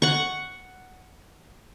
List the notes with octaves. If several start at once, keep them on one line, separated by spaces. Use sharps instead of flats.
F#5 C#6